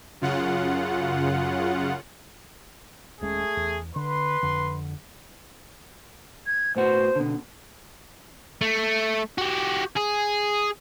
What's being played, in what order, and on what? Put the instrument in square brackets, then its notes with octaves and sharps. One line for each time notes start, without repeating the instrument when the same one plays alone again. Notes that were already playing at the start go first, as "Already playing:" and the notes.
[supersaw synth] F#2 C#3 F4 F#5
[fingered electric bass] D#1 G#3 C#4 [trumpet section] A3 G#4
[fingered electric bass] E2
[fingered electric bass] D3 [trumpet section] B4 C6
[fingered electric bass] F2 D3
[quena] G#6
[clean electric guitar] A2 B3 F#4 [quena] C5
[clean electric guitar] B2 D3
[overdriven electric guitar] A3
F#4 G4
G#4